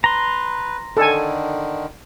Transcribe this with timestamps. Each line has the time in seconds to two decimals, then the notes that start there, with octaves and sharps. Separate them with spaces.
0.04 B4 A#5 C6
0.97 D3 D#3 A4 G#5